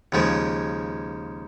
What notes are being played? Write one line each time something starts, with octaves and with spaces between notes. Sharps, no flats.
D#2 C#3 F3 G#3